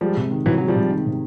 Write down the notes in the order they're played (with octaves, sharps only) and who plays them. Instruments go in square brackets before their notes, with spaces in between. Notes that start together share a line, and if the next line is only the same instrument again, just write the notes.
[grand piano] F3 G3 [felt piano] G#3
[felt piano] C3
D#3
[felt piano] C3 [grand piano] E3 F#3
[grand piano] F#3 [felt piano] G#3
[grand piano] F3 G3
[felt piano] C3
D#3
C3